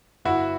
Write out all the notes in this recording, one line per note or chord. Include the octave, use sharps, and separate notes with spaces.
G1 E4 F#4